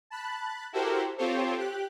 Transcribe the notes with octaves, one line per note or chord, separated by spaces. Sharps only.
A5 B5 F#6
E4 F#4 G4 A4 A#4 C5
C4 F4 G4 A4 C5 C#5
G4 F#6